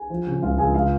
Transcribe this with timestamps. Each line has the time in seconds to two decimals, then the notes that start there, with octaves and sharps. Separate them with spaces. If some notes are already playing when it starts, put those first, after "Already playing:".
Already playing: G#4 G#5
0.10 F3
0.27 C#3
0.42 C#2 F4 F5
0.58 C#2 G#4 G#5
0.75 F4 F5